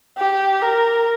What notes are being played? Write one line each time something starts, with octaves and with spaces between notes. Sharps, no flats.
G4
A#4